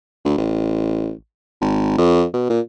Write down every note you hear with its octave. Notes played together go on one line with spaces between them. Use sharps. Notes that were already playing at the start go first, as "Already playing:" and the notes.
D2
A1
G#1
F2
B2
A#2